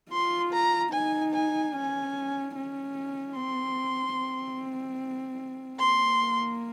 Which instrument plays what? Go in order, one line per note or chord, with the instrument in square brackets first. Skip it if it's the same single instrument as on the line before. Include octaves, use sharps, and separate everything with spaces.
[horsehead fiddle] F4 [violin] C6
[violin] A#5
[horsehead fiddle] D#4 [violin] G#5
[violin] G#5
[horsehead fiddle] C#4 [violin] G#5
[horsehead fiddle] C#4
[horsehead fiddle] C4 [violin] C6
[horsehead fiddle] C4
[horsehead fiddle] A#3 [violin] C6